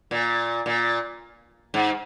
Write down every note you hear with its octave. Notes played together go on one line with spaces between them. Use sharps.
A#2
A#2
G#2